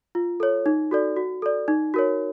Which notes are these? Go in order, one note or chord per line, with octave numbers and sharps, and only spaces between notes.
F4
A4 C#5
D#4
F#4 A4 D5
F#4
A4 D5
D#4
F#4 A#4 C#5